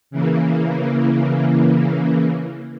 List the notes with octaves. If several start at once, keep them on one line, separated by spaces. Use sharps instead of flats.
C#3 E3 A#3